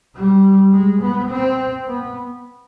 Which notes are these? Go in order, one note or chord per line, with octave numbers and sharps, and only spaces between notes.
G3
G#3
B3
C4
B3